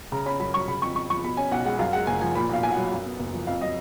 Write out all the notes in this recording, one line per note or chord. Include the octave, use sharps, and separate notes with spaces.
C#3 A#5
C#4 B5
F#2 B5
F#3 C#6
C#3 B5
F2 C#6
F2 C#6
F3 C#6
B2 B5
C#4 G#5
B1 F#5
G#3 F#5
F#2 F5
G#3 F#5
F#1 G#5
F3 G#5
A#2 B5
B1 F5
B1 G#5
F#3 F#5
F#2
B3
F#1
F3
F2 F5
F#3 D#5